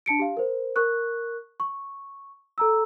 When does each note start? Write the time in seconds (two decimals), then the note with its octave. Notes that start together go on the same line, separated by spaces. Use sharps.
0.06 D4 A5 C#7 D7
0.19 G4 F5
0.37 A#4 C5
0.76 A#4 C#6 F#6
1.60 C#6
2.58 A4 A#5 E6